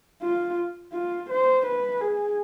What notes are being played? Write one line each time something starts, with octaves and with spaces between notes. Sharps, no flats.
F4
F4
C5
B4
G#4